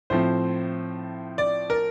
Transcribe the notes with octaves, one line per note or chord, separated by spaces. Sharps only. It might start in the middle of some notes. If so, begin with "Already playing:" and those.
A2 F3 C4 C5
D5
A#4